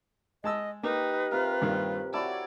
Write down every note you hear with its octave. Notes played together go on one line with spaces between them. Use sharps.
G#3 D#5 A5 E6
A#3 D#4 G4 B4
C3 F4 A#4
G2 A#2 D#3
E4 F#4 C#5 D5 A5